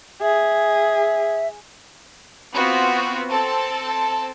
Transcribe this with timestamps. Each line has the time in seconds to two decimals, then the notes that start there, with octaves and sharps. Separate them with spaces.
0.22 G#4 E5
2.54 B3 C4 F4 F#4
3.30 C4 A4 A5